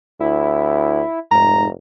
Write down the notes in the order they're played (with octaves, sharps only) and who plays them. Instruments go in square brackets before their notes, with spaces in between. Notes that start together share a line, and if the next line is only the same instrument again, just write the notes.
[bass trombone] D2 [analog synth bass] E4
[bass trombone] F1 [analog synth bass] G#2 [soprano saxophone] A#5